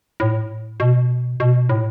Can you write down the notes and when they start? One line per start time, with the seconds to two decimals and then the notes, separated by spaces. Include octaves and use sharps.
0.20 A2
0.80 B2
1.40 B2
1.69 A2